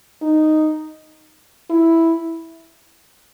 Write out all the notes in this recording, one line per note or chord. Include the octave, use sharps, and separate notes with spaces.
D#4
E4